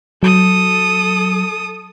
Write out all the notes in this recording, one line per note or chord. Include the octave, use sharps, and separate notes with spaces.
F#3 A4 D#6